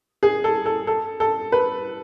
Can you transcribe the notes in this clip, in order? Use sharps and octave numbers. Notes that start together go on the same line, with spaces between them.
G#4
A4
A4
A4
A4
B4